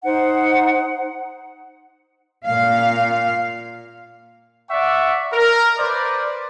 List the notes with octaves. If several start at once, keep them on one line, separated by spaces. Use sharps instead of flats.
D#4 C5 F#5
A#2 F5
D5 E5 F#5 C#6
A#4
B4 C5 D5